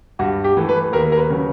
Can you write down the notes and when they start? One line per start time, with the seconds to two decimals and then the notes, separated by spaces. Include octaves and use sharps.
0.19 G2 F#4
0.44 G4
0.57 E3 A3
0.69 B4
0.93 D#2 A#4
1.12 A#4
1.17 B4
1.30 C#3 F#3